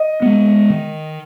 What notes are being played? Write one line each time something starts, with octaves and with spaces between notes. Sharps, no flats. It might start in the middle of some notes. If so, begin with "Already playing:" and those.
Already playing: D#5
G#3 B3
D#3